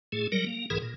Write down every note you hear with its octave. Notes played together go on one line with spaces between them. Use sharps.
A2 A3 G#4
F#3 G3 A#4
A#3
B1 G#2 E3 G#4 A#4
A#2